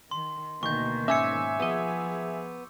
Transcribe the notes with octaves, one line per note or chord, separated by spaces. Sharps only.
D#3 C6
D2 B2 D#3 A#3 C#6 G6
G#2 C#4 E5 G#5 D6 E6 C#7
F3 B3 G#4 D#5